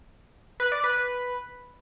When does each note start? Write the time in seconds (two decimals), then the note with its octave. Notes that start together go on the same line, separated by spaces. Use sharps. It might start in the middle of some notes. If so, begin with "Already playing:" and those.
0.60 B4
0.72 D5
0.84 B4